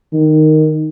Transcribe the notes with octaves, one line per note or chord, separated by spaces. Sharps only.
D#3